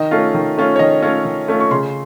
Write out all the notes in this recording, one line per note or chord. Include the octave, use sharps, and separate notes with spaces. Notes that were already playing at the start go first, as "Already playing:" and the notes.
Already playing: D#3 D#5
A3 C#4 F4
D#3
A3 C#4 F4
C#5
D#3 D#5
A3 C#4 F4
D#3
A3 C#4 F4
C#6
C#3 C6